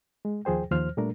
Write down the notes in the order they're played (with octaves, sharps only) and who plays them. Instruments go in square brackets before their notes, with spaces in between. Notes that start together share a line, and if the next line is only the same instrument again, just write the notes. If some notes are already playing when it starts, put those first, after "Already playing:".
[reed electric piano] G#3
D#2 F3 G#4 C5 G5
D#2 F3 C5 F6
A#2 G3 A3 D4 A#4